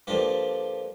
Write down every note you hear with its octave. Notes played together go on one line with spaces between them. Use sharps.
G2 D3 F3 A#3 F4 G4